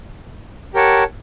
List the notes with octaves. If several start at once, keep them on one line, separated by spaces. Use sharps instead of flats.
G4 A#4 C#5 F#5 A5